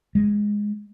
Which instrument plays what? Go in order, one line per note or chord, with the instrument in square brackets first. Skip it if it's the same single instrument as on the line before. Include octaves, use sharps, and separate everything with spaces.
[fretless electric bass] G#3